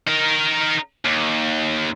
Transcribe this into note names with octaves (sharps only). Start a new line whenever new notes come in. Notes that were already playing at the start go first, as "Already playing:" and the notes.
D#4 A#4
D#2